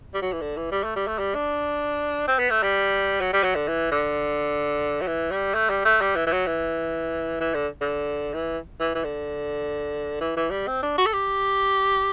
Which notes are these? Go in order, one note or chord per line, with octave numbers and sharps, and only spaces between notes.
G3
F#3
E3
D3
E3
G3
A3
G3
A3
G3
D4
C4
B3
A3
G3
F#3
G3
F#3
D3
E3
D3
F#3
E3
G3
A3
G3
A3
G3
E3
E3
F#3
E3
E3
D3
D3
E3
E3
E3
D3
E3
E3
G3
C4
D4
F#4
A4
G4